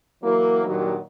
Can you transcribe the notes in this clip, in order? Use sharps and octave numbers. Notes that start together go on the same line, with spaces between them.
E3 F#3 A#3
G2 A#2 D#3 F#3